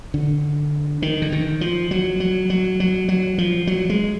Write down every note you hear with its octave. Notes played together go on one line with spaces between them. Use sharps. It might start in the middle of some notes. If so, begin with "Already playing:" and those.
D3
D#3
D3
D#3
F3
F#3
F#3
F#3
F#3
F#3
F3
F#3
G#3